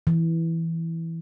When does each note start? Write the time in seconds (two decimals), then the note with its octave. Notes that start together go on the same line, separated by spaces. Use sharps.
0.07 E3